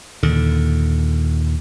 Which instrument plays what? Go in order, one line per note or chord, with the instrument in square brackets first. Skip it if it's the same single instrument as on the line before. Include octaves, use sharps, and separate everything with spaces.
[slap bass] D#2 A#2 D3